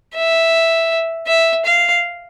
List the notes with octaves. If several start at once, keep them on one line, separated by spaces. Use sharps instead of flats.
E5
E5
F5